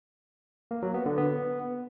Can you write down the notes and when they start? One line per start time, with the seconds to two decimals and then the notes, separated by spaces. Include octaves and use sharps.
0.71 A#3
0.82 F#3
0.94 B3
1.06 D3
1.17 B3